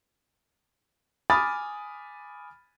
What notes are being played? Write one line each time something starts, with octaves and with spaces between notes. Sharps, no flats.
G#5 B5 D6 D#6 F6 A6